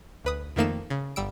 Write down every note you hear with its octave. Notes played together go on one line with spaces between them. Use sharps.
D2 B4 D#6
F2 D#3 A3 A#3 D#4 E7
C#3
G1 G3 E6 D7